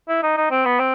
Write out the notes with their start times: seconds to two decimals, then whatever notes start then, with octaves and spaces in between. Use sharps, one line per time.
0.08 E4
0.23 D#4
0.37 D#4
0.51 C4
0.65 B3
0.79 C4